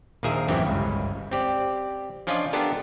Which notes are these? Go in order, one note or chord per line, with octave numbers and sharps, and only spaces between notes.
A#1 D#2 F3 G#4 A#4 E5
A1 F#2 E3 C4 C#4 G4
G1 C#2
C4 G4 D5
F3 C#4 D4 F4 D5 D#5
B3 D4 F4 G4 A4 A#4